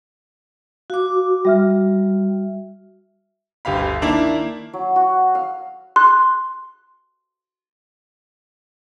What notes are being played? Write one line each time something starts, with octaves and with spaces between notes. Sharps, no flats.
F#4 F5 D6
G3 F#4 E5 F6
G1 D2 G4 F5 B5
D#3 A#3 D4 E4
F#3
F#4
F5
C6 F#6